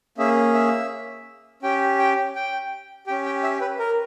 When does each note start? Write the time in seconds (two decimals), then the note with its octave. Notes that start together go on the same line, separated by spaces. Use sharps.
0.18 A#3 C#4 G#4 E5
0.54 E5
1.62 C#4 G4 G5
1.99 G5
2.36 G5
3.07 G4 G5
3.11 C#4
3.26 G5
3.43 E5
3.61 B4
3.79 A#4